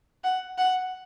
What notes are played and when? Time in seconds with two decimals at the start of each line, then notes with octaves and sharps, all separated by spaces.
0.24 F#5
0.58 F#5